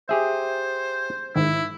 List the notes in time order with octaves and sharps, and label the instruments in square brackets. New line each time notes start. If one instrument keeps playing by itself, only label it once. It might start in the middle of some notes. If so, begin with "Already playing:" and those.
[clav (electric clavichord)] G4 G#4 E5 [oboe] C5
[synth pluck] G#2 D#3 [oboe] E4